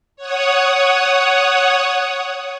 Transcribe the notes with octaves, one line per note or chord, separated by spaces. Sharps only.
C#5 F#5 D#6